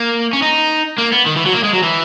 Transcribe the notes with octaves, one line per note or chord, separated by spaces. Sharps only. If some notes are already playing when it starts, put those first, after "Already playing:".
Already playing: A#3
C#4
D#4
A#3
B3
D#3
E3
F#3
A#3
G#3
F#3
E3